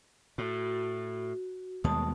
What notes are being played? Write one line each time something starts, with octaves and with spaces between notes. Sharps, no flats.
A2 F#4
D#2 B2 G3 G#3 A5 D#6